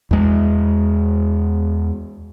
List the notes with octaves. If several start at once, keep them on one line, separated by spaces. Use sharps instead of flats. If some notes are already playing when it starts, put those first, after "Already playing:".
E2 G#3